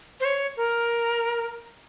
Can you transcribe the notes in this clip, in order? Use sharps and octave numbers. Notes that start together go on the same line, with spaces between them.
C5
C#5
A#4